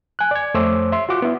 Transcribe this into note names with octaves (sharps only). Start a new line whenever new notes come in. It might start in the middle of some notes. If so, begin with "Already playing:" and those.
G#5 F#6
D5 G#6
F2 A3 C5 C#5 D6 E6
E5 C6
F4 F#4 F#5 D6
B3 E4